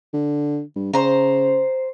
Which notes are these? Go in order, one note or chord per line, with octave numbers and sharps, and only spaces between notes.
D3
G2
C#3 C5 A#5